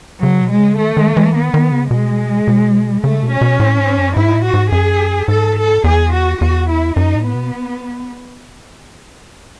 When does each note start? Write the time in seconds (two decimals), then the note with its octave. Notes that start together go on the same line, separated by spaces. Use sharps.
0.22 C#3 F#3
0.42 B2
0.51 G#3
0.59 C#3
0.78 D#3 A3
0.97 D#3
1.17 E3
1.34 D#3 B3
1.54 D#3
1.72 C#3
1.91 B2 G#3
2.48 B2
3.03 C#3 A3
3.23 B2
3.32 C#4
3.41 B2
3.60 A2
3.78 G#2
3.98 F#2
4.16 G#2 E4
4.35 A2
4.44 F#4
4.54 G#2
4.72 F#2 G#4
5.28 G#2 A4
5.56 A4
5.84 E2 G#4
6.12 F#4
6.41 E2 F#4
6.69 E4
6.96 F#2 D#4
7.15 A2
7.25 B3
7.35 B2